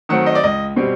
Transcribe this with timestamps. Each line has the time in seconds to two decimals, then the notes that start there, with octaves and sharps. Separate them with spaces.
0.09 D#3 F#3 A3 C4 F#5
0.26 D#5
0.35 D5
0.43 C#2 D#5
0.76 B2 G3 C4